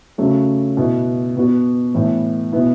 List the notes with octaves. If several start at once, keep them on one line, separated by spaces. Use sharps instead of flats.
C#3 F#3 A3
B2 B3 E4
B2 B3 F#4
A2 E3 B3 E4
B2 B3 E4